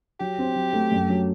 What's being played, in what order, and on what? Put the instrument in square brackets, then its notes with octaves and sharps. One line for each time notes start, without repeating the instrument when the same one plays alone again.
[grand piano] F#3 [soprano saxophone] G4
[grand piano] C4
F#3
A3
F#2
F#3